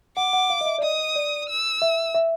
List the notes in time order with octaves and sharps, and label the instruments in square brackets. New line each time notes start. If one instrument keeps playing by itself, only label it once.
[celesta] F#5 [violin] D6
[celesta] F#5
F5
D#5
E5
D5
[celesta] D#5 [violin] D#6
[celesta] D5
[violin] E6
[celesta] E5
E5